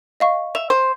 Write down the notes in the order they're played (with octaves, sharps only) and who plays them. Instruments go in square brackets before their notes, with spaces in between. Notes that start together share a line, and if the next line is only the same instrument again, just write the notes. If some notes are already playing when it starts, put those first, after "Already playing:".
[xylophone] D#5 F5 C#6
[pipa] E5 [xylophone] F7
[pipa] C5